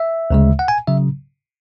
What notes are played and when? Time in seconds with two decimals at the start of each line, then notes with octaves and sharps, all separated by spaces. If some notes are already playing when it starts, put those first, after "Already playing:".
Already playing: E5
0.30 D2 C#3 G#3
0.59 F#5
0.68 G#5
0.88 C#3 F#3 E5